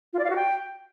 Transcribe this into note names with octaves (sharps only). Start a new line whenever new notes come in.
F4
D5
F5
F#4
G5